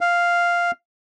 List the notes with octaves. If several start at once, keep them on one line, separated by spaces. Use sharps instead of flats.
F5